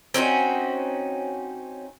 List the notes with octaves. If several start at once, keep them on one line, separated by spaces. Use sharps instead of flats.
C4 C#4 D#4 F#4